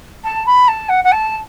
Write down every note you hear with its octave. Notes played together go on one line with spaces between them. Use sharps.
A5
B5
A5
F#5
F#5
A5